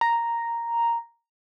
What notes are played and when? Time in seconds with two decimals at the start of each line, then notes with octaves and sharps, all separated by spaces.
0.01 A#5